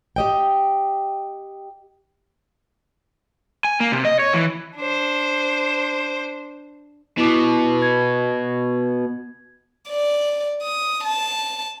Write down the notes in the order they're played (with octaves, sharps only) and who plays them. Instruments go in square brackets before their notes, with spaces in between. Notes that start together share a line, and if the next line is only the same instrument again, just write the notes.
[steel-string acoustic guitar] G4 D#5 G5
[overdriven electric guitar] G#5
A#3
C3
D#5
C#5
E3
[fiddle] D4 C5
[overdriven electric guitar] B2 [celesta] E4 D6
[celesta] G#6
[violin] D5
D#6
A5